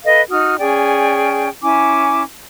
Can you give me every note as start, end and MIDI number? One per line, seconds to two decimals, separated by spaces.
0.04 0.20 69
0.04 0.20 71
0.04 0.20 75
0.04 0.20 77
0.30 0.58 63
0.30 0.58 66
0.30 0.58 87
0.30 0.58 89
0.59 1.48 61
0.59 1.48 68
0.59 1.48 74
0.59 1.48 79
1.62 2.22 61
1.62 2.22 64
1.62 2.22 80
1.62 2.22 86